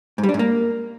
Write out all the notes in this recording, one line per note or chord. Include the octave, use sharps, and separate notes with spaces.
G#2
G3
D4
G#2
A#3